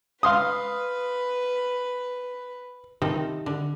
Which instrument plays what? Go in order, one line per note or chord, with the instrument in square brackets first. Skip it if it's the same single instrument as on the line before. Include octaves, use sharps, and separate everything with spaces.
[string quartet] B4 [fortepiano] F5 C6 D#6
[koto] C3 D#3 F3 C4 D#4 A4
D3